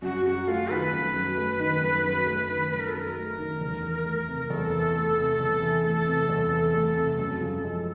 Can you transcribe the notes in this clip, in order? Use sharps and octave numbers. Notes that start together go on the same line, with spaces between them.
F#2 F#4
F#3 F#4
A3 F4
D#3 B4
F#2
F#3
A3
D#3
F#2
F#3
A3
D#3
F#2 B4
A#4
A4
F#3 A#4
A3
D#3
E2
E3
A3
C3
E2 A4
E3
A3
C3
E2
E3
A3
C3
E2
E3
A3
C3
F#2
F3
G#3